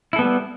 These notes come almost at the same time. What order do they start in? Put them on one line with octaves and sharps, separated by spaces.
E4 A4 B3 G3